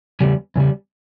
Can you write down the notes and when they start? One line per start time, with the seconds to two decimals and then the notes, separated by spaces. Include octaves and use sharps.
0.21 E2 C#3 G3
0.56 E2 C#3 G3